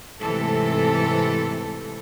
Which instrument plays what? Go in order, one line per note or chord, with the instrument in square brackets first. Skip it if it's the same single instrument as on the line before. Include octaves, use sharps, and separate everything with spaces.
[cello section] G#2 C3 E3 A3 A4